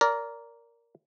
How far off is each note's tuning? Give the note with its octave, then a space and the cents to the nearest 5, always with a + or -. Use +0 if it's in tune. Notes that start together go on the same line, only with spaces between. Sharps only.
A#4 +0 D5 -25